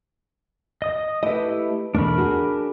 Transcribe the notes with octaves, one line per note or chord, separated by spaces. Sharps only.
D#5 D#6
A3 E4 G4 B4 D#5
B1 E2 A3 D4 A#4 B5
F#4 G#4